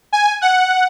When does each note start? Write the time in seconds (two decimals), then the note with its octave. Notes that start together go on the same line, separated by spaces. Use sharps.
0.13 G#5
0.41 F#5